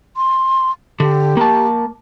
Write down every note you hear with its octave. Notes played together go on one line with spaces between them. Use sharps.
C6
D3 G4
A#3 A5